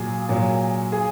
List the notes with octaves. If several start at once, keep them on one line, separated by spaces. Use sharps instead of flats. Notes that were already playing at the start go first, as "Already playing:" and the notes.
Already playing: A#2 F#3 G#4
A#2 F#3
G#4